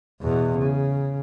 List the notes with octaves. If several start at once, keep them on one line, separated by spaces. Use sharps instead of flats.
E2 B2
C#3